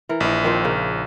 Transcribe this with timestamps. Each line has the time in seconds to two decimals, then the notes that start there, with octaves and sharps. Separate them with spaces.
0.09 E3 A#4
0.20 A#1 E3 D#5
0.44 D#3 F3 C4
0.64 C#3 A#3